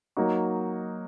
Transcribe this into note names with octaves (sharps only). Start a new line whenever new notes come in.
F#3 A#3 D#4 F#4